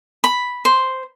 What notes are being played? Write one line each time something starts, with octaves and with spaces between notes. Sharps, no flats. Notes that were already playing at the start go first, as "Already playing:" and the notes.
B5
C5